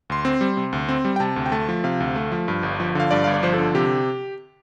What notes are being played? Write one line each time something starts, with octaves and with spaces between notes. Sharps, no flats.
D2 C6
C4
G3
C3
D2
C4
G3
G5
C3 A5
D2
G5
A3 A5
F3
C3 F5
D2
A3
F3
G2
G1
F3
D3 F5
G2 D5
G1 F5
D5
F3 C5
D3 A4
C3 G4